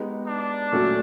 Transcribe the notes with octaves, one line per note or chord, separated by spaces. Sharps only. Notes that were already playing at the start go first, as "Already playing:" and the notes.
Already playing: G#3 B3 D#4 G4
D4
A#2 F#3 A3 C#4 F#4